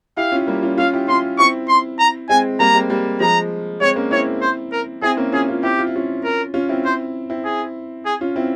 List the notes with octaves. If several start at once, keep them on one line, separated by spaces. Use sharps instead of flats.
E4 G4 F5
C#4 F4
G3 A#3
C#4 F4
C#4 F4 F5
E4 G4
C#4 F4 C6
C4 E4 C#6
C6
A#5
G#3 C4 G#5
G3 A#3 A#5
G#3 C4
G3 A#3
F3 G#3 A#5
G#3 C4 C#5
A#3 C#4
C4 E4 C#5
C5
A#4
C4 E4 G#4
A#3 C#4
C#4 F4 G#4
C#4 F4
C4 E4 G4
F4
E4
C#4 F4
A#4
C#4 F4
C4 E4
C5
C4 E4
G#4
G#4
C#4 F4
C4 E4